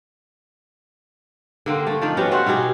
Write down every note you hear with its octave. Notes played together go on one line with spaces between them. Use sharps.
D3 A#3 C4
A3
F3 D4 D#4
B3 C#4 F#4 G4
F#4 C5 E5 F#5
B2 D#4 G4 G#4